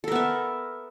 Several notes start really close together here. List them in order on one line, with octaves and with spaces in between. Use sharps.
A4 A#4 B3 E5